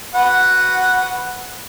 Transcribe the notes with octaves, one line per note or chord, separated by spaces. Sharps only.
F#4 B4 F#5